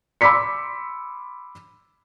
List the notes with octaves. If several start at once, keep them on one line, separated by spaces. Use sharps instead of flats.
B5 C6 D6 E6 B6 C#7